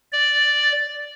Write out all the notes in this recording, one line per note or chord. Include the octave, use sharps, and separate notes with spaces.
D5